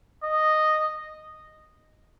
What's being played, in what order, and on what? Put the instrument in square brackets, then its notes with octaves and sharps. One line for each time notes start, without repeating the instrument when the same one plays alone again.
[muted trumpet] D#5